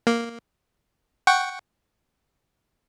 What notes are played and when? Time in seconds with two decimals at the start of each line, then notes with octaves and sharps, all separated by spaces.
0.07 A#3
1.27 F#5 G5 C#6